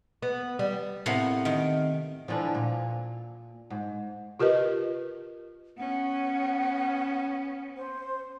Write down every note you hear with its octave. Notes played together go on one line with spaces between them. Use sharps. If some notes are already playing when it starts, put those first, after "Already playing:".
B3
G3
A2 C3 A#3 B3
D#3
D3 E3 F3
A#2
G#2
F4 G4 A#4 B4 D#5
B3 C#4 F#5
C5